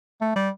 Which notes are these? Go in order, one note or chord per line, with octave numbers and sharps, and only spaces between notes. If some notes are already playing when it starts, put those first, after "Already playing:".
A3
G3